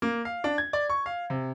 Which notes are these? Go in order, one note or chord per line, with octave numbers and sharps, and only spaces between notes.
A#3
F5
D4
G#6
D5
C#6
F5
C3